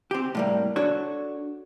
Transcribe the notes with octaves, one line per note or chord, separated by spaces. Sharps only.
C4 G4
A2 G3 A#3
D4 F#4 A4 C#5